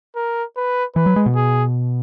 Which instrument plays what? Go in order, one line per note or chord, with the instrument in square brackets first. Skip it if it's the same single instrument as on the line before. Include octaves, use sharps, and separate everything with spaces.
[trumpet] A#4
B4
[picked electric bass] E3 [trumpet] B4
[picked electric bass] F#3
G#3
B2
[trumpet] G#4